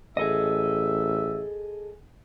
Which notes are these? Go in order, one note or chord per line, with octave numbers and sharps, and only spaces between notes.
A1 G#4 A4 D#5 E5